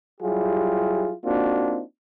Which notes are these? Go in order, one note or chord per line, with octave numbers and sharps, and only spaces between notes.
F#3 G3 E4 F4 G4 G#4
A#3 C4 D4 D#4 F4 F#4